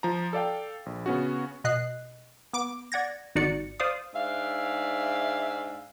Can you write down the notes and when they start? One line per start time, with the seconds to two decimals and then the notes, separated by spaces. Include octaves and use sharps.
0.03 F3 A#5
0.33 A4 D5 F5 G5
0.86 A#1
1.06 C#3 B3 C#4 F#4
1.64 B2 D#5 F#6 C7
2.53 B3 D6 D7
2.92 D5 F#5 G#6 A#6
3.35 G#1 D#4 F#4 D5 C#7
3.80 C5 D5 F5 D#6
4.14 G#2 D4 E5 F5